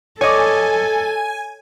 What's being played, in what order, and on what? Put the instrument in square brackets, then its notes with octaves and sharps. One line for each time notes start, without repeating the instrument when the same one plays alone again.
[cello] A4 [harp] C#5 D#5 D6 [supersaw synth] G#5